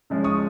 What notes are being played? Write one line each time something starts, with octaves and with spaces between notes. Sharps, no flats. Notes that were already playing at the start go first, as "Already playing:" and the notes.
C#3 F3 G#3 C#4
C#6 D#6